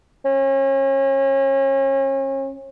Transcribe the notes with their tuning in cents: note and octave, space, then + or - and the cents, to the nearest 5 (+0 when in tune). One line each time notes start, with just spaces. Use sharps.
C#4 -35